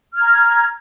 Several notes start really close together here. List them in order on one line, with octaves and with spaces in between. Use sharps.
F6 G#6 A#5